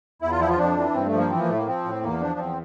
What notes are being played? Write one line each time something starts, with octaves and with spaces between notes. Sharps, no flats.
E2 E4
F4
F3 E4
F4
F2 D4
E3
G2 C4
A3
F3
A#3
E3 C4
A#3
A2 A3
A#3
F3 C4
A2
E2 A#3
F3 D4
E2 C4